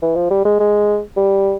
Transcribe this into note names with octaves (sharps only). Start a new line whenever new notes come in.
E3
F3
G3
G#3
G#3
G3